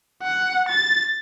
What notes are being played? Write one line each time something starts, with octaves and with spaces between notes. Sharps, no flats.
F#5
A6